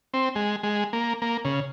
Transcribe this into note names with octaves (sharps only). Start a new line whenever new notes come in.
C4
G#3
G#3
A#3
A#3
C#3